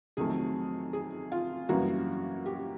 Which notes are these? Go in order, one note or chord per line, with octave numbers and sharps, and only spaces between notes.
F2 C3 D#3 F#3 A3 G#4
G#4
F4
F#2 C#3 E3 G3 A#3 F#4
G4